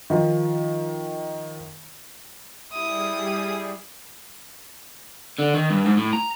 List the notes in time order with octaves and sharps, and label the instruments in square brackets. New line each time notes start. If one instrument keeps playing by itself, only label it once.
[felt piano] D#3 F3
[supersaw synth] G3 G#4 [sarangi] E4 [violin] D#6
[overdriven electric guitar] D3
D#3
G2
G#2
A2
A#5